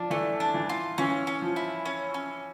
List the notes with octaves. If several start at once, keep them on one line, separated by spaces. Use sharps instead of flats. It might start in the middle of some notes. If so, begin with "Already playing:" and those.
Already playing: F3 D4
E3 A3
D4
E3
F4
E3 C#4
C#4
F3
E4
C#4
C#4